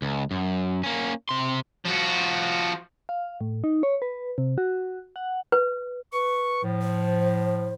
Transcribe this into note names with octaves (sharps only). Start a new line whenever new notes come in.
C#2
F#2
A#3 C#4
C3 C6
F3 F#4
F5
A2
D#4
C#5
B4
C3
F#4
F#5
B4
B4 C#6
A2 F3
C5